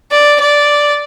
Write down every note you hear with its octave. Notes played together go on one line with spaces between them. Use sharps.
D5
D5